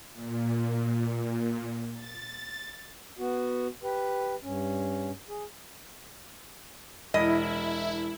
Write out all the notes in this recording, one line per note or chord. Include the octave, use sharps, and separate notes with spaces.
A#2
A6
B3 F#4
G4 B4
G2 C#4
G#4
E1 E4 D#5